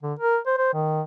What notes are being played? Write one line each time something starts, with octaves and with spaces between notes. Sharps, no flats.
D3
A#4
C5
C5
D#3